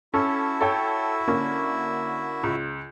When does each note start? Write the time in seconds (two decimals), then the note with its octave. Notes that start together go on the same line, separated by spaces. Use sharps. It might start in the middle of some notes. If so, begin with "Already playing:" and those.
0.14 C#4 E4 F#4 A4 E5
0.61 A4 C#5 G5
1.28 D3 A#3 C#4
2.43 C#2